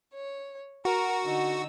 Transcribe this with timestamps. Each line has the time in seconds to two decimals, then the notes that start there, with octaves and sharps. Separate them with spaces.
0.14 C#5
0.85 F#4 A#4
1.24 D3 D#4 E6